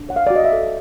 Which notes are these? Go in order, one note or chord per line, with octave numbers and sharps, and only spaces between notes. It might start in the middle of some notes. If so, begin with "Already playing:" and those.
Already playing: D4
C#5 F#5
F5
F#4 D5
D#5
E5
A4